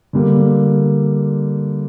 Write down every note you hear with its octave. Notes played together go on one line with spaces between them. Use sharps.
D3 G3 A#3